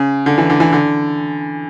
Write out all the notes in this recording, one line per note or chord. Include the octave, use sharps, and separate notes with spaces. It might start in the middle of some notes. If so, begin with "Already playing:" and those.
Already playing: C#3
D3
E3
D3
E3
D3